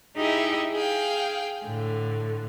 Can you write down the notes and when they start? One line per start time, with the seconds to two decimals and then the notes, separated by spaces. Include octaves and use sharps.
0.16 D#4 E4 G4 G#4 D#5 E5
0.74 G#4 F5 G5
1.65 A2 D3